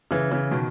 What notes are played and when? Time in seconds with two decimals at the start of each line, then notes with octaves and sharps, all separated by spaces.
0.11 C#3 E3
0.31 C#3 E3
0.51 B2 D#3